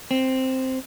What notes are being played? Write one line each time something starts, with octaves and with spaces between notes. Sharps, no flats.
C4